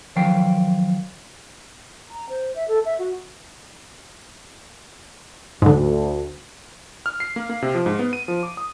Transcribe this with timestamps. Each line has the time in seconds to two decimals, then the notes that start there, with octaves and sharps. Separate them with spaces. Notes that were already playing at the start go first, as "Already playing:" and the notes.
0.16 D#3 F3 F#3 F5 G5
2.10 A#5
2.29 C5
2.55 E5
2.68 A4
2.85 E5
2.99 F#4
5.62 D2 G#2 D3
7.06 F6
7.20 C7
7.36 A#3
7.50 A#3
7.62 C3
7.75 F3
7.86 G#2
7.99 B3
8.13 D#7
8.28 F3
8.43 D6
8.57 D#6